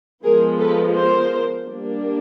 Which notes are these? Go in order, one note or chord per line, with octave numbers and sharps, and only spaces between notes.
F3 G#3 B3 G#4 A#4
A4 B4
A#4 C5
G3 A#3 D4